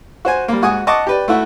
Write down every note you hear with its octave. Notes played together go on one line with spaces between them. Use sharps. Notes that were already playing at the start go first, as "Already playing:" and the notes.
F#4 C5 G#5
G3 A#3
G#2 F#4 G#5 D#6
D#5 F#5 A5 C#6 D6
G4 B4 D5
A3 E4 F#4